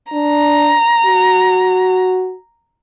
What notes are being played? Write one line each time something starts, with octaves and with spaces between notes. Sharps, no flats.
D4 A#5
F#4